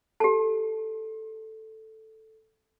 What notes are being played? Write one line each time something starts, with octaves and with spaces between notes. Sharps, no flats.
G4 A4 A5